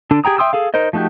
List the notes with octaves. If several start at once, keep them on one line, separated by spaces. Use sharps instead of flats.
D3 D4 A4
G4 G#4 G5 A#5 D#6
E5 G5 C6 D#6 E6
G#4 A4 F5
D#4 A#4 C5 D#5
F3 A3 D#4 F#4 G4